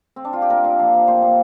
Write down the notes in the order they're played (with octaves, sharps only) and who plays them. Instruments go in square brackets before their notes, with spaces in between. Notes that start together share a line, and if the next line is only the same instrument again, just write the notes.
[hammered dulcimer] C4
D4
F4
G4
A#2 A#4
A#2
F3
F3
A#2 C5
A#2